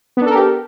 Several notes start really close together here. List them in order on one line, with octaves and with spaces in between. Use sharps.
B3 D4 A4 A#4 G4